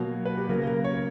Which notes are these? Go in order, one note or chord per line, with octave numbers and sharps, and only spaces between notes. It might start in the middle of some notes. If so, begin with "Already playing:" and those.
Already playing: B2 F#3 A#3
B4
G4
C#3 F#3 A#3 A#4
A#4
C#5